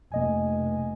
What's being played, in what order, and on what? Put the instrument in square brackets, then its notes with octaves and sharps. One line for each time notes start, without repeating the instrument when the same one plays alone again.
[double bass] F1 [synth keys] A#3 D#5 G#5